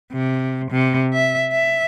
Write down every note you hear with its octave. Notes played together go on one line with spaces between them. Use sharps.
C3
C3
E5
E5